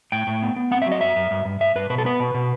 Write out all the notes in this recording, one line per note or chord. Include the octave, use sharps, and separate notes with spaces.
A2 G5
A2
B3
B3
C4 F#5
E5
F#3
D#5
F#2 E5
F#2
G2
G2
G2 E5
G2 B4
B2 B4
A4
B3 B4
B2
B2